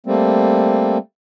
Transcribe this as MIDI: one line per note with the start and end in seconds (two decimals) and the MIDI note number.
0.06 0.98 55
0.06 0.98 57
0.06 0.98 58
0.06 0.98 60